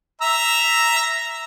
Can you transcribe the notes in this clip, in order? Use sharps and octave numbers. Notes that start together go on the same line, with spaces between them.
E5 A#5 E6